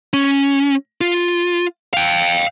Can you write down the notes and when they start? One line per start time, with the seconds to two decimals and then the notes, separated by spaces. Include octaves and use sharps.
0.13 C#4
1.01 F4
1.93 F5 G5